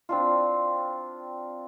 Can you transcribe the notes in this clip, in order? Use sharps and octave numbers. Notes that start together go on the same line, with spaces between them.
C4 D4 F4